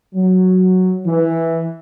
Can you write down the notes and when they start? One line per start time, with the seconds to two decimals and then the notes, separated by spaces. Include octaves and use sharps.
0.15 F#3
1.06 E3